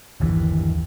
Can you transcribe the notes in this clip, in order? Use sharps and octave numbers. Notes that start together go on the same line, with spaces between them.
G1 D#2 E3